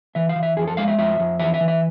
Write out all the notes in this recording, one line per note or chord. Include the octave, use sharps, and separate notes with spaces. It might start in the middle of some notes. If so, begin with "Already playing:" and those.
E3 E5
F5
E3
E5
F2 G#4
A4
G#3 F5
E5
F2 E5
F2
E3 E5
E5
E3
E5